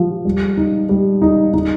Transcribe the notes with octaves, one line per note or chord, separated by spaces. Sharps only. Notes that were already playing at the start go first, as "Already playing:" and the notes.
Already playing: F3 G4
G3
D#4
G3
D#4
D#4